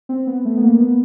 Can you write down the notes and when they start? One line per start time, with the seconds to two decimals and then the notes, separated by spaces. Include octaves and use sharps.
0.09 C4
0.27 B3
0.45 A3
0.57 B3
0.62 A#3
0.80 B3